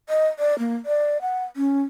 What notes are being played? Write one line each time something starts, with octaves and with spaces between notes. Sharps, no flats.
D#5
D5
A#3
D5
F#5
C#4